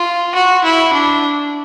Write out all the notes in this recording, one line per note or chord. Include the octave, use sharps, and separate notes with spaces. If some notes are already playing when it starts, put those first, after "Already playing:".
Already playing: F4
F#4
E4
D4